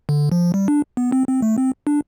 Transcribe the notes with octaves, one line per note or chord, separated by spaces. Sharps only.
D3
F3
G3
D4
B3
C4
C4
A3
C4
D4